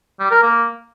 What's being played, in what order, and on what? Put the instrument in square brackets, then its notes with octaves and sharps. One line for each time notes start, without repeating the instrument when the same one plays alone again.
[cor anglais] G3
A#4
A#3